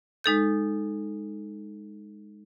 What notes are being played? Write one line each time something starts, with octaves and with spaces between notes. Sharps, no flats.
G#3 D#4 A4 G6